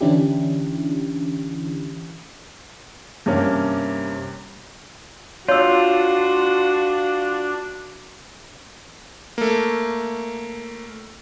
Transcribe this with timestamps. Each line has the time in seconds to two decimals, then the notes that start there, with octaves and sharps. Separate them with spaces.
0.01 D3 E3 C#4 D4 E4 G4
3.26 G2 C3 A#3 C#4
5.49 D4 F4 F#4 C#5 E6
9.38 A3 A#3